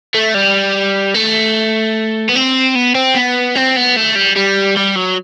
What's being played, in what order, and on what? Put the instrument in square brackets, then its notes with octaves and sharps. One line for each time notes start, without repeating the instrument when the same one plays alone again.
[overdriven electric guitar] A3
G3
A3
B3
C4
B3
C4
B3
C4
B3
A3
G3
G3
G3
F#3